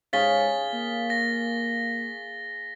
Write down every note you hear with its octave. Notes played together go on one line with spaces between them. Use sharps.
G#2 G#4 C#5 F5 A6 B6 G7
A#3
A#6